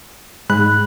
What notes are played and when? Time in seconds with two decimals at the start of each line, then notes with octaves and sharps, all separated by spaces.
0.50 G#2 B5 F#6